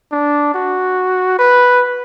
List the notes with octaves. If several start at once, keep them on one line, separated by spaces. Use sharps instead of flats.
D4
F#4
B4